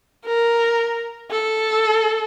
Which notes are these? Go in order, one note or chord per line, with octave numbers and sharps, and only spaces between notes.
A#4
A4